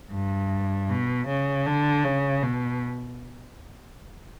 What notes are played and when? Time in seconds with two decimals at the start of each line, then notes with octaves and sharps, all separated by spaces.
0.13 G2
0.90 B2
1.28 C#3
1.66 D3
2.04 C#3
2.43 B2